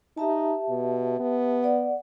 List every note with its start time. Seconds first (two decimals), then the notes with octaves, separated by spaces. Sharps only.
0.17 D#4 G4 E5 A5
0.70 B2
1.20 B3
1.63 D5 F#5